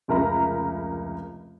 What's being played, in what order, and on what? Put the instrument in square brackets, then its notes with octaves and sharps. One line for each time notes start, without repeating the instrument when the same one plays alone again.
[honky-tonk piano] F1 C#2 A#4 E5 A#5 B5